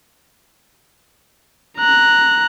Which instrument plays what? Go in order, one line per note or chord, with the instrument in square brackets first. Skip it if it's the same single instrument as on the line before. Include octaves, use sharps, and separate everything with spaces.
[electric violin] A#5 F#6